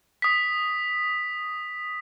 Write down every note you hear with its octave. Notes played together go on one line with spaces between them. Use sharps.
D#6 B6